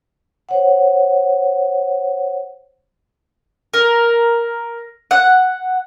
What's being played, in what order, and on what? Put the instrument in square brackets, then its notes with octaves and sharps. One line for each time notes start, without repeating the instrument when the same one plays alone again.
[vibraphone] C5 C#5 F#5
[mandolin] A#4
F#5